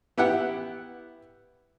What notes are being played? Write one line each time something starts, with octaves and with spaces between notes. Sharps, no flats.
B3 E4 G4 F#5 G5